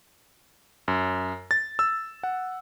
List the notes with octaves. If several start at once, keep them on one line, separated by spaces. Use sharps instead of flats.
F#2
A6
E6
F#5